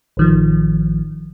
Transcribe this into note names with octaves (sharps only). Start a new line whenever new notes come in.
A1 D#3 F3